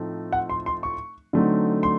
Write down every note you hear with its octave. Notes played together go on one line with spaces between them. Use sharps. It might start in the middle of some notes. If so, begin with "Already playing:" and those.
Already playing: A2 F3 A3 C4 D#4
F#5
C6
C6
C#6
D3 F#3 A3 C4 D#4
C6